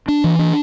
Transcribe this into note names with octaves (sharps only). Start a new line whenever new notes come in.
D4
E3
D4